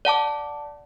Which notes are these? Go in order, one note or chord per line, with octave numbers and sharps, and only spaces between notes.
D5 F#5 A5 D6